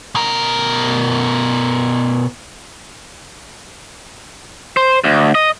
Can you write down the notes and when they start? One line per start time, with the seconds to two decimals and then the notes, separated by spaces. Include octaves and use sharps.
0.15 B2 A#4
4.77 C5
5.04 D2
5.35 D#5